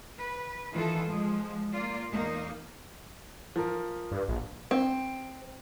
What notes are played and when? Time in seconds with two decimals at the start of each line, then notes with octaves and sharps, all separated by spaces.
0.16 B4
0.73 D#3 E3 F4 A4
1.08 F3 G#3
1.72 A#3 F4 D5
2.12 E2 A#3 D#4
3.56 F3 A#4
4.12 G2
4.28 A#1
4.71 C4